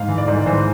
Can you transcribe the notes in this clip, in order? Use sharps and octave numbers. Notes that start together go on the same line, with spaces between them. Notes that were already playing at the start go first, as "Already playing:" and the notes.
Already playing: G#2 F5
E3
D5
G#2
E3 C5